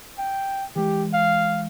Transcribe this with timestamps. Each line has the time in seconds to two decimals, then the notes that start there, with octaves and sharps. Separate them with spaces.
0.18 G5
0.76 E3 G#3 G4
1.13 F5